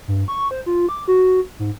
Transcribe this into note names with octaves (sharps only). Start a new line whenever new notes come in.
G2
C#6
C5
F4
D6
F#4
G#2